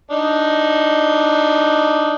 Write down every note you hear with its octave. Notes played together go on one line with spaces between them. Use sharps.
D4 D#4